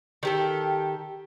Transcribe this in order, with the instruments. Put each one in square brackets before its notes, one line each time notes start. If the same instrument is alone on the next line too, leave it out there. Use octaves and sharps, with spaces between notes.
[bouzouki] D#3 G4 A4